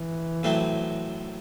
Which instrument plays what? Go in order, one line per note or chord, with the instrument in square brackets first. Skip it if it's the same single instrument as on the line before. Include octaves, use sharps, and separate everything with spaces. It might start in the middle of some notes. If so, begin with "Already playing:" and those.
Already playing: [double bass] E3
[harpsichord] A2 F#3 A3 C4